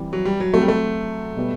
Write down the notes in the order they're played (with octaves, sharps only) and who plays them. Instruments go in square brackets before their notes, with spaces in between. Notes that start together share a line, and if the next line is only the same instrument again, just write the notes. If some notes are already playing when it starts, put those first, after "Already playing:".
Already playing: [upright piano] E3 G3 C4 G4
[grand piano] F#3
G3
F#3
[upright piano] F#3 C4 F#4 A4 [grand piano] A3
[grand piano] G3
A3
[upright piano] B2 G3 B3